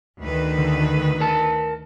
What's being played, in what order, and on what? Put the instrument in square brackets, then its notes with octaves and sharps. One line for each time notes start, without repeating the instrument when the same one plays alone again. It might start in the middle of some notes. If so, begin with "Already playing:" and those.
[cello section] D2 D#3 B4
[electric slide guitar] D3
A#4 A5